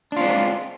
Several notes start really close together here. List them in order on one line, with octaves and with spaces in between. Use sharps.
D4 F4 C4 G#3